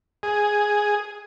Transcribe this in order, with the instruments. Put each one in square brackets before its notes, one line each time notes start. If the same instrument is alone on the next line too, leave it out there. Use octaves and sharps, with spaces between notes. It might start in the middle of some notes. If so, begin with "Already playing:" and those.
[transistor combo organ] G#4